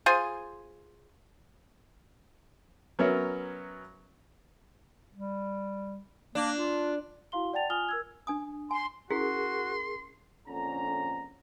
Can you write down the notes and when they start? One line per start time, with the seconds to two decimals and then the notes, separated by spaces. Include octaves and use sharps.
0.06 F4 G#4 C5 G#5
2.99 F#3 B3 C#4 A#4 C#5 E5
5.14 G3
6.35 A#3 D4
6.57 F4
7.32 E4 F#4 F5 C6 G7
7.53 D5 F#5 G5 A5 A6 F7
7.70 F4 G#5 D#6 F6 F7 G7
7.89 A#4 E6 G#6
8.27 D4 G#5 D#6
8.71 G#5 C6
9.11 C#4 E4 F#4 G#4 A#4 C6
10.48 A#1 F2 D3 C#4 A#5